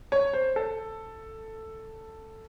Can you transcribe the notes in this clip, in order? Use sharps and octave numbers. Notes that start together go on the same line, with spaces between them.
C#5
C5
A4